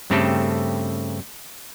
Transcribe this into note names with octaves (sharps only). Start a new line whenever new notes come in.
G2 C#3 A3 C4 G4 A4